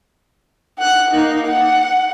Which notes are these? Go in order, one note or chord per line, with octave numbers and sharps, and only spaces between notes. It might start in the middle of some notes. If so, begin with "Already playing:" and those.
F#5 F#6
A#3 D#4
F#5